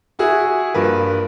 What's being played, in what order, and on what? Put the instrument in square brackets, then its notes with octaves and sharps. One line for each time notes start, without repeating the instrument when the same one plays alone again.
[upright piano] E4 F#4 G#4 E5
G2 F3 A#3 B4